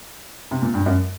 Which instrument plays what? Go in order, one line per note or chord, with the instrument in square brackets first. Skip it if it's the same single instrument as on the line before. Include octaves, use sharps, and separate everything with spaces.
[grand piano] C3
A#2
G2
F#2